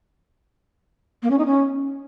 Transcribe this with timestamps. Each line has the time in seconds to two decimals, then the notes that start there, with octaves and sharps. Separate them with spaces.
1.22 A#3
1.30 C#4
1.38 D#4
1.46 C#4